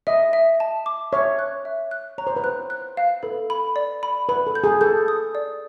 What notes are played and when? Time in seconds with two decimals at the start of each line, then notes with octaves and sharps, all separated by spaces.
0.07 D#5 E5
0.33 E5
0.60 A5
0.86 D6
1.12 C#5 E5
1.39 F#6
1.65 E5
1.91 F#6
2.18 C#5 A#5
2.27 C5
2.36 B4
2.44 C5 F#6
2.70 F#6
2.97 F5
3.23 A4 B4
3.50 B5
3.76 D5
4.03 B5
4.29 B4 B5
4.47 A4
4.55 G6
4.64 G#4
4.81 A4 G6
5.08 D#6
5.35 D5